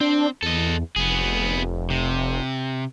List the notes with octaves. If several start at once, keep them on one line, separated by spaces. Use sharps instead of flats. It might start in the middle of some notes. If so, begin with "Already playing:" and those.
C4 D4
E2 A4 D#5
F1 B3 G#4
C3